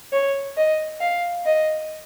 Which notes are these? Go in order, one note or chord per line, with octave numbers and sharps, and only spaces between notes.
C#5
D#5
F5
D#5